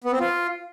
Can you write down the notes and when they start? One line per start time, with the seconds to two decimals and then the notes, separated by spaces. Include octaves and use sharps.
0.04 B3
0.12 C4
0.20 F4